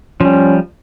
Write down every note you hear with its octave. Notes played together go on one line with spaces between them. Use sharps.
F3 G3 C#4